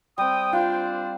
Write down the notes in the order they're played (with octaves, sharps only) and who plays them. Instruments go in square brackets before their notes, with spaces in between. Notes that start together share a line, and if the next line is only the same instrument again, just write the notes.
[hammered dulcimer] G3 C4 [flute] G5 [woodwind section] D#6
[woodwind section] D4 C5 [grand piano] F4 [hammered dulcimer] F5